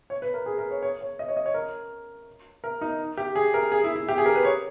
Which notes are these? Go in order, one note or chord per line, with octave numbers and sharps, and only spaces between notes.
C#5
B4
A#4
G#4
A#4
C#5
C#5
C#5
D#5
C#5
D#5
C#5
A#4
A#4
D#4
G4
G#4
A#4
G#4
E4
E4
G4
G#4
A#4
B4
C#5